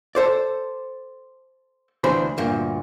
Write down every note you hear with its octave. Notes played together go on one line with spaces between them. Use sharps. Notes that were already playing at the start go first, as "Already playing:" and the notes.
A4 C5 D5
D2 E3 D4 C5 B5
D2 G2 A#2